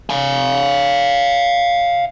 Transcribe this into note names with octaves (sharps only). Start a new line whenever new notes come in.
F5 G#5